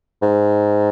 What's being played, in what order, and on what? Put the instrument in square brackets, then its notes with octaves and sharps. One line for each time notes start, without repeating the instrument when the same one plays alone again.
[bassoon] G#2